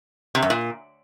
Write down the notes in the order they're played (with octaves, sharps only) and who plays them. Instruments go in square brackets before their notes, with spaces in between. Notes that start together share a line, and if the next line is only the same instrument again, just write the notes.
[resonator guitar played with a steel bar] C3
F#2
A#2